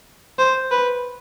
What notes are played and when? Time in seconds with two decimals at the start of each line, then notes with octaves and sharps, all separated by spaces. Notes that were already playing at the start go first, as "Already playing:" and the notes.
0.39 C5
0.71 B4